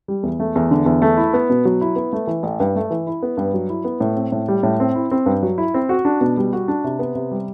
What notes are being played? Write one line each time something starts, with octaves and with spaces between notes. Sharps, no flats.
G3
E2
A3
E2
D3
E2
A3
E4
B3
B2
F#3
E4
B3
A3
E3
A1
G2
A3
E3
E4
B3
G2
F#3
E4
B3
A2
C4
A2
G3
A2
C4
E4
C4
G2
F#3
E4
C4
F#4
D4
B2
G3
F#4
D4
C3
B3
C3
G3